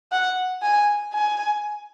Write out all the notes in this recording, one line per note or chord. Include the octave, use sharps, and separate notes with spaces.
F#5
G#5
G#5